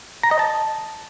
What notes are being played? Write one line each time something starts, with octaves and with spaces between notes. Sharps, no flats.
A#5
D#5
A5